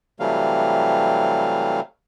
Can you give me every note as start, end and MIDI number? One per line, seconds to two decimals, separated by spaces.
0.20 1.80 48
0.20 1.80 52
0.20 1.80 54
0.20 1.80 55
0.20 1.80 57
0.20 1.80 77